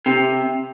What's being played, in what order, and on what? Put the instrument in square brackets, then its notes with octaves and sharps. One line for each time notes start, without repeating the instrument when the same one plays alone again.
[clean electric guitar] C3